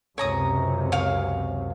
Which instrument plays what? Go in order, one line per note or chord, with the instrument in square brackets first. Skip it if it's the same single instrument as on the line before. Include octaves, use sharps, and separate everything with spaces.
[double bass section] C#2 F#2 C3 [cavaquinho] C#5 A#5 D#6
[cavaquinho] C#5 F5